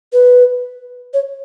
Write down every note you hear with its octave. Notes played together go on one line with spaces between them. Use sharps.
B4
C#5